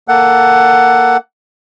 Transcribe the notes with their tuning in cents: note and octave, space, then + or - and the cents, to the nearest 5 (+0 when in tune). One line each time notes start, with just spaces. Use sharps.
A#3 +0 A4 +10 F#5 +10